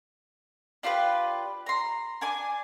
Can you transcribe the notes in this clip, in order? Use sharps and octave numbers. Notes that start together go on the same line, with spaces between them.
D4 F4 G4 B4
A#5 C6
D4 G#5 D6